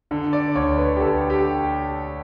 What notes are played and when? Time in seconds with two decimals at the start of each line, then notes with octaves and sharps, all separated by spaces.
0.11 D3
0.33 D5
0.55 D2 C#5
0.77 B4
0.96 G4
1.01 D2 A4
1.30 G4